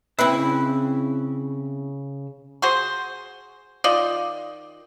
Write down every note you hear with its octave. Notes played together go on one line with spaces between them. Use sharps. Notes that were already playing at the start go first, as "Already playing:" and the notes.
C#3 C4 E4 B4 E6
F#4 G#4 C5
D#3 F4 D5 D#5